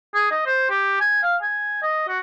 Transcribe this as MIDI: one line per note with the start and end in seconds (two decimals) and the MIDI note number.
0.14 0.31 68
0.31 0.43 75
0.46 0.69 72
0.70 0.97 67
1.00 1.20 80
1.23 1.36 77
1.42 1.79 80
1.83 2.06 75
2.08 2.19 66